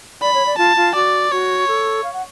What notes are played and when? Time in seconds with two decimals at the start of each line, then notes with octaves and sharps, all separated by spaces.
0.22 D5 B5
0.34 C#5
0.46 D5
0.58 F4 A5
0.77 F4
0.95 F#4 D5
1.32 F#4 C#5
1.68 A4
2.04 F5
2.13 F#5